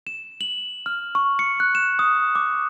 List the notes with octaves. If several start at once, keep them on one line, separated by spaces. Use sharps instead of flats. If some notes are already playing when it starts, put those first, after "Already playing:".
E7
F#7
F6
C#6
C#7
F#6
E7
D#6
D6